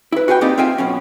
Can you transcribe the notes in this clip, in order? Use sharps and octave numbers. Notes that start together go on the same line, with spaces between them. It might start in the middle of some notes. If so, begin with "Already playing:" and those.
E4 B4
F#4 G#4 B4 F#5 G5
A#3 C4 D#4 G4 G#4 D5
C4 F4 E5 G5 G#5
F#2 B2 C#4